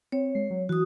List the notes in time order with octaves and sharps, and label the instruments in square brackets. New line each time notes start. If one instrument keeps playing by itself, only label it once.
[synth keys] C4 [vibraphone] C#5
[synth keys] G#3 C7
F#3
[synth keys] E3 [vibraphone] F#4 D#6